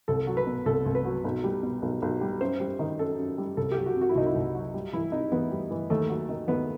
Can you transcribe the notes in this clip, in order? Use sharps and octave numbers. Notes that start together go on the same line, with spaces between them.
C2 A4
F#3
B4
B2
C2 A4
C2
B4
F#3
B1
G3
B2
B1
B1
G3
F#2 C5
G3
D#3
F#2 A4
F#2
G3
C2 A4
G4
F#3
F#4
C3
F#4
E4
C2 D#4
E4
C2
F#3
G3
E3 E4
C3 D#4
E2 B3
G3
E3
D#2 A3
F#3
D#3
D#2 B3